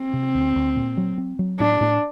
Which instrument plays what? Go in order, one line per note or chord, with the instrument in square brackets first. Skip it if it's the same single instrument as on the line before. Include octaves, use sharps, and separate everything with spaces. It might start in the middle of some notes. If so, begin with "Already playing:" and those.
Already playing: [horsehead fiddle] C4
[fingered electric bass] C3
D2
D2
A#2
F#3
C4
F#3
[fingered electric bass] A2 [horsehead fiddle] D4
[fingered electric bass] A2